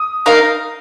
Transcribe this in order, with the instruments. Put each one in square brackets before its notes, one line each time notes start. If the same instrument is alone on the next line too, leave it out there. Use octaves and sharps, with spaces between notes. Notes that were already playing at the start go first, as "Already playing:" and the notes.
Already playing: [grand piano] D#6
[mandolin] D#4 A#4 F5